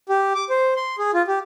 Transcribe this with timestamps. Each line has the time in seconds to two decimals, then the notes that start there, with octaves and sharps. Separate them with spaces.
0.09 G4
0.35 D6
0.50 C5
0.76 C6
0.98 G#4
1.14 F4
1.27 G4